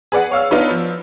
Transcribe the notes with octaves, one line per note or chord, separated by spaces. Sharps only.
G#4 B4 D5 F#5
C#5 F5 E6
B3 D4 D#4 F4 B4 C#5
F3